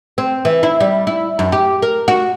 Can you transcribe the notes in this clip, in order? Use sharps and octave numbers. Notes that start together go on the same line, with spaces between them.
C4
E3
E4
G3
E4
F#2
G4
A#4
F#4